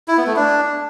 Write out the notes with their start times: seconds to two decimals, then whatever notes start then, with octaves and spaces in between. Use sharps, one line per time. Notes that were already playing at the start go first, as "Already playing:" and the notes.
0.08 E4
0.17 B3
0.27 A3
0.36 D4